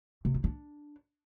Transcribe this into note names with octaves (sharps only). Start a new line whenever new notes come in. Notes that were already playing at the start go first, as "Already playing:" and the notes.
C3
D#4
D4